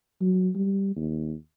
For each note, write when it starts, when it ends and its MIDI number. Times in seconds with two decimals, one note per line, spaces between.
0.21 0.50 54
0.55 0.96 55
0.96 1.35 39